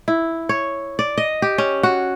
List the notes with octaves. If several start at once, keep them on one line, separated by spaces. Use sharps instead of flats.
E4
C#5
D5
D#5
G4
C#4
F#4